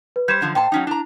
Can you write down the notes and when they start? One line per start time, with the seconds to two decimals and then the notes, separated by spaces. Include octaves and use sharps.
0.16 B4
0.28 G3 C5 G6 G#6 E7
0.41 F#2 D3 F3
0.55 A#2 C5 G5 A5
0.72 F#3 C#4 D#4
0.87 D4 E4 A#5